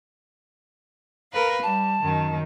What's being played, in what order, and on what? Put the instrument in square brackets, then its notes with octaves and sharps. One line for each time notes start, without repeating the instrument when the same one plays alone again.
[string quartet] A#4 B4 F5
[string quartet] G3 [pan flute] A5
[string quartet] F#2 D#3